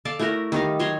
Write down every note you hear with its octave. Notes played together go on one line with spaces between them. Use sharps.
A4 D5 F5 A5
A3 E4 F#4 A#4
D#3 G3 D#4 F5
F#3 C#5 A#5 C6